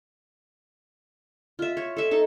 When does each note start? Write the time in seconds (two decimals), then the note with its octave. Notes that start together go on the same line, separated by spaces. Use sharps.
1.59 F4 E5
1.77 C#5
1.96 A4 E5
2.11 D#4 A4